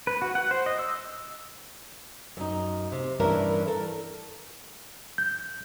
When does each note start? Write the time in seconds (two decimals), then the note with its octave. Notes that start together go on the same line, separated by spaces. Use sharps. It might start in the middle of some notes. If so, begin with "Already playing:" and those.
0.07 B4
0.22 F#4
0.35 F#5
0.51 C5
0.66 D#5
0.79 E6
2.37 F#2 D#4
2.92 C3
3.20 G2 E3 C#4 D4 E4 A#4
3.67 A4 A#4
5.18 G6